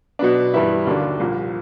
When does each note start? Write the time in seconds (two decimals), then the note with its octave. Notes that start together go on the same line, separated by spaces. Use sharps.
0.19 B2 F#3 B3 D4
0.54 G2 E3 G3 B3 E4
0.87 D#2 D3 F#3 A#3 D4
1.20 C2 A#2 F3 A#3